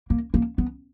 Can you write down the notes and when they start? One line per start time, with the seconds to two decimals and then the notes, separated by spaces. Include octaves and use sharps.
0.10 A#3
0.34 A#3
0.58 B3